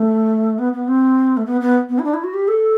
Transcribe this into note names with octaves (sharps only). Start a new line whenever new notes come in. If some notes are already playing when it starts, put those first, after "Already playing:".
Already playing: A3
B3
B3
C4
A3
B3
B3
B3
E4
D4
E4
F#4
G4
A4